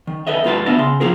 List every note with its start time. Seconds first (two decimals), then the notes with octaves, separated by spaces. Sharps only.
0.07 D#3
0.27 A4 B4 D#5 E5
0.44 D#2 G#2 F4 B4 A5
0.66 D2 B3 D4 D#5 E5 A5
0.79 C#3 C6
1.00 F3 A#3 F4 G#4 A#4